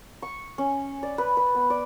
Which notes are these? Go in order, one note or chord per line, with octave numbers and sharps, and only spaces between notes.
C#6
C#4
D5
B4
B4
B3
D5